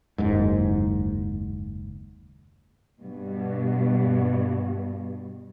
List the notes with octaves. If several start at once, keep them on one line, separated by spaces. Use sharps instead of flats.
F#1 D#2 G#2
G2 B2